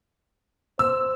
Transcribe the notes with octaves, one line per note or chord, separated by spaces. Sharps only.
C5 E6